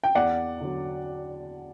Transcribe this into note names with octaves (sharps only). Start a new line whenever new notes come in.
G5
E2 D5 F#5
D3 F#3